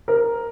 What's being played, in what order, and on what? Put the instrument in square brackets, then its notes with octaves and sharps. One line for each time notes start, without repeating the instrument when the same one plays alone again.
[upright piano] A#4